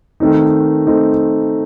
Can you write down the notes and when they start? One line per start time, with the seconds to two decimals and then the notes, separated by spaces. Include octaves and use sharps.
0.20 D#3 A3 C4 D#4
0.87 D#3 A3 C4 D#4